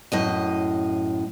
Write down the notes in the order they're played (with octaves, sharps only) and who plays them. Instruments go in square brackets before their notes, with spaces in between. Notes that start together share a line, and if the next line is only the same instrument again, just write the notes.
[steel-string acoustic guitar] F#2 A2 D#5